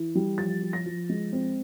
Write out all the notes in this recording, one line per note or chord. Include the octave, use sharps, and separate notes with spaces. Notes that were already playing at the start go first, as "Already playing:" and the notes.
Already playing: E3
G3
F3 A6
F3
A#6
F3
G#3
C4